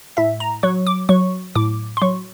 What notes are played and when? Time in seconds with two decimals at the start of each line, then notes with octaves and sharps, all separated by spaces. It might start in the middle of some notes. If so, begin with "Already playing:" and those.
0.17 A2 E5
0.40 A#5
0.63 F#3 C#6
0.87 D6
1.09 F#3 C#6
1.55 A2 D6
1.97 C6
2.02 F#3 C#6